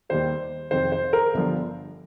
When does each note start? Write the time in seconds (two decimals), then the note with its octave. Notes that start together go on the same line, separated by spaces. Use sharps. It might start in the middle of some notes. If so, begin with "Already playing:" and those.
0.09 D#2 D#3 G3 C5
0.71 F2 C3 D#3 C5
0.92 C5
1.13 A#4
1.34 G1 G2 D3 F3